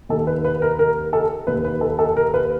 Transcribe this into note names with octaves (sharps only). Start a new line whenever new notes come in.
D#2 D#3 A4
B4
B4
A#4
A#4
A4
D#2 D#3 B4
B4
A4
A4
A#4
B4